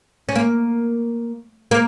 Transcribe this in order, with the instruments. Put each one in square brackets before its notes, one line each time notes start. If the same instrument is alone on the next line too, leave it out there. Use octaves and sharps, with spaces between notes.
[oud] C#4
A#3
A#3